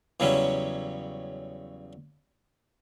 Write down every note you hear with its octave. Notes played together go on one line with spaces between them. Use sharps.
E2 C#3 F#3 G3 C#4 E4